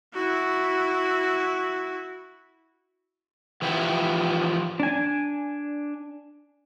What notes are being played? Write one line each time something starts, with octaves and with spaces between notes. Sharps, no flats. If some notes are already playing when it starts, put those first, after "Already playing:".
E4 F#4
E3 F3 E4 F4 G4
D4 G#5